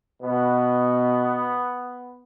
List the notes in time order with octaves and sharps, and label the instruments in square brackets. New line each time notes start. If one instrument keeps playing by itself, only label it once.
[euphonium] B2 [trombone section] B3